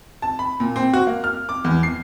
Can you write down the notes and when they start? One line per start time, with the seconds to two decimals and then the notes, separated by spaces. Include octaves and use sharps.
0.22 A5
0.39 B5
0.60 A#2
0.76 C4
0.93 F#4
1.07 A#3
1.24 F6
1.49 D6
1.65 E2
1.83 C7